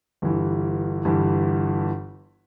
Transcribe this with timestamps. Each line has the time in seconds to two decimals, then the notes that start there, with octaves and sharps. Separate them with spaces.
0.22 G1 G2 E3
1.05 G1 G2 E3